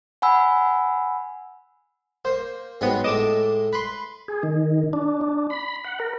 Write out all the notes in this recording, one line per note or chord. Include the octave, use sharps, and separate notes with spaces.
F#5 G#5 B5 E6
A#3 C5
G#2 F#3 G#3 B3 C4
A2 G#3 A3 D#5 D6 E7
B4 B5 C6
G#4
D#3
D4
D4
B5
F#5
A#4